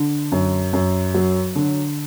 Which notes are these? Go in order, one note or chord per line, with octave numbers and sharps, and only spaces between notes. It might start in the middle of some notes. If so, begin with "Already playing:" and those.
Already playing: D3
F#2
F#2
F#3
D3